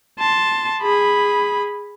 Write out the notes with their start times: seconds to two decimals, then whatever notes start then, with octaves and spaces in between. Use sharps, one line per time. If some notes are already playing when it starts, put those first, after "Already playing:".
0.19 A5 C6
0.82 G#4 B5